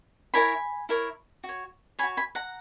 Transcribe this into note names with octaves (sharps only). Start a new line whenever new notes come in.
E4 A#4 C#5 G#5 B5
E4 A#4 C#5
F#4
C#5
F#4 C#5 G#5 B5
G#5 B5
F#5 A#5